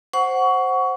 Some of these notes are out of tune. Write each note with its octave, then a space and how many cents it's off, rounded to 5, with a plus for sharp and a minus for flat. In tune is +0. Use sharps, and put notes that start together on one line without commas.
C5 +0 F#5 +0 C#6 +20